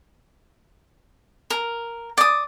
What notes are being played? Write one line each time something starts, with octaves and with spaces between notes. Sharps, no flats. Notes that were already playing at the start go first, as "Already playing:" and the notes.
A#4
D5 D#6